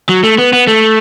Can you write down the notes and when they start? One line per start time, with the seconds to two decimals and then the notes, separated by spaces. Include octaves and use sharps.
0.09 F#3
0.24 A3
0.38 B3
0.53 B3
0.67 A3